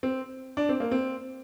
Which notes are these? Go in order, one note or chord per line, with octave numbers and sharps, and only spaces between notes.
C4
D4
C4
A#3
C4